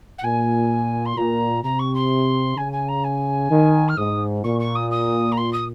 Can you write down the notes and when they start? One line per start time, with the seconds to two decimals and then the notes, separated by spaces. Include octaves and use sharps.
0.18 F#5
0.24 A#2 G#5
1.05 C6
1.17 A#2 A#5
1.63 C3 A#5
1.79 C#6
1.94 C6
2.57 C#3 G#5
2.72 G#5
2.88 A#5
3.04 G#5
3.50 D#3
3.88 F6
3.97 G#2 D#6
4.44 A#2 C#6
4.59 C#6
4.75 D#6
4.90 D#6
5.32 A#5
5.37 C6
5.52 D#6